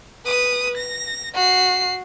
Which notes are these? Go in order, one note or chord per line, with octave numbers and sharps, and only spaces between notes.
B4 D#6
A#6
F#4 C7